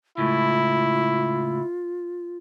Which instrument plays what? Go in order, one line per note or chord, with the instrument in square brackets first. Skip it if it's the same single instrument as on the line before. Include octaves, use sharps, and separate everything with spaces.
[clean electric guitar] C#2 A2 [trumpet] E4 [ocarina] F4